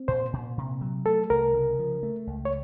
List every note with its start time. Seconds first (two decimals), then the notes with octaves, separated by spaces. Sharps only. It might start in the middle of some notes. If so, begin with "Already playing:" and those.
Already playing: C4
0.08 A#2 C5
0.33 A#2
0.58 C3
0.81 F#3
1.06 A3 A4
1.30 C2 A#4
1.54 C#3
1.79 F3
2.03 A3
2.27 C#2
2.45 C#5